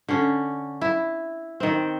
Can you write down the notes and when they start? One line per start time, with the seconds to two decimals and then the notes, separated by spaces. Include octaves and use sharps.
0.09 D3 C#4
0.81 E4
1.60 D#3 C4